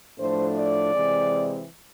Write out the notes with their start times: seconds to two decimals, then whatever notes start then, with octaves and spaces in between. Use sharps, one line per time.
0.19 A2 F3 A3 D4 C5
0.56 D5
0.93 C3 E3 G#3 C4